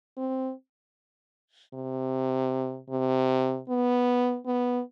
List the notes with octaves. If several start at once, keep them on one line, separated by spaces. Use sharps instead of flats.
C4
C3
C3
B3
B3